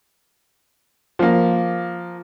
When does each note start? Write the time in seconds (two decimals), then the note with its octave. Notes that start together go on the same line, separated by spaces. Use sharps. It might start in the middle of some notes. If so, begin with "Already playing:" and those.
1.19 F3 A#3